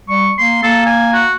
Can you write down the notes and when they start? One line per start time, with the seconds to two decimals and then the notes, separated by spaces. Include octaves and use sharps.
0.09 G3 C#6
0.38 A#3 C6
0.63 A#3 A4
0.86 G#5
1.13 F#4